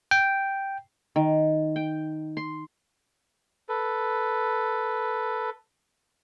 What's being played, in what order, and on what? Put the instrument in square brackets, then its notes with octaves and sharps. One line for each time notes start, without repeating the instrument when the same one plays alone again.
[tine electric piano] G5
[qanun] D#3
G5
C6
[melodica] A4 B4